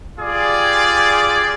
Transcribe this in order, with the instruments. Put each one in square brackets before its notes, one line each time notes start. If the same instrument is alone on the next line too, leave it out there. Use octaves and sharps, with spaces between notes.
[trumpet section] F4 G4 G#4 D5